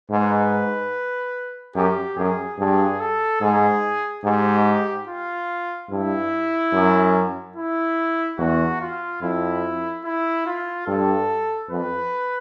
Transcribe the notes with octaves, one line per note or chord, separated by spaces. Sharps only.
G#2 B4
F#2 G4
F#2 G#4
G2 G#4
A4
G#2 G#4
G#2 G4
F4
G2 E4
F#2
E4
E2 F#4
F4
F2 E4
E4
F4
G2 A4
F2 B4